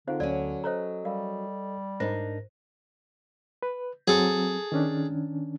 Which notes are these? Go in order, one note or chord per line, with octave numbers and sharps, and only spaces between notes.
D3 C4 D#4 F4 G#4 C5 F5
D2 F#3 C#4 D5
A4 C5 C#5 D#5 A#5
G3 A#4 F5
G#2 D4 D#4 A#4 C5 A#6
B4
F#3 C4 G#4 A4
D#3 C#4 D4